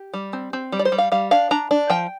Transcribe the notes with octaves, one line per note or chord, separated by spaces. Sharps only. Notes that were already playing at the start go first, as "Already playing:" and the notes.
Already playing: G4
G3
C4
C4
G3
D5
C5
G3
F5
G3 F5
D4 F5
D4 A#5
D4
F3 G5